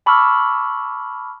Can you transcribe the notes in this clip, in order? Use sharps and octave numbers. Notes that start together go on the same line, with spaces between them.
A5 B5 C#6 D6 E6 F6